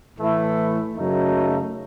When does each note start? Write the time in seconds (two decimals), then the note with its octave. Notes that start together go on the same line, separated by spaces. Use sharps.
0.16 A2 E3 A3 E4
0.95 F#2 C#3 F#3 A3 D#4